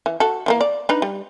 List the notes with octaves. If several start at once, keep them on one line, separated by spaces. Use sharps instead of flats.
E3
F#4 A4
E3 F#3 A#3
D5
D4 D#4 B4
G3